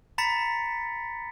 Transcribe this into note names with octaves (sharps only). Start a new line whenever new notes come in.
A#5 B5 A6 B6 C#7